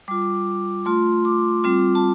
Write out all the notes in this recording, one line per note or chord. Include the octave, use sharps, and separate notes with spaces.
G3 F4 D6
A3 F4 C6
D6
G3 C4 F4
A5